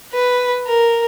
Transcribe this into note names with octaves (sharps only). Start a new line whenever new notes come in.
B4
A#4